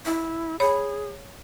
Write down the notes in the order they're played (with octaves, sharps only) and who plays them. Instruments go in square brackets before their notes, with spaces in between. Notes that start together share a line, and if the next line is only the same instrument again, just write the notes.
[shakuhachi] E4
[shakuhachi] G#4 [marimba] C#5 B5